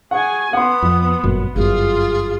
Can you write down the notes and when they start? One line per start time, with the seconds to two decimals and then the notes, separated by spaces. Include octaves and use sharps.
0.11 G#4 F#5 G#5 C#6
0.53 B3 F#5 C6 D#6
0.82 F2
1.23 G1 F#2 A#2
1.56 G1 F#2 F4 G#4